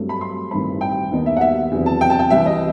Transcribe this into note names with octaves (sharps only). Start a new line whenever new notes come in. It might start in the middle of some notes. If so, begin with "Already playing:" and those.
Already playing: G2 F#3 A3 C4
B5
C6
A1 G2 D#3 G3 C4 B5
G5
D#2 D#3 G3 B3 D#4
E5
F#5
E5
E2 C3 F#3
A5
G5
A5
G5
C2 C3 E3 E5
D#5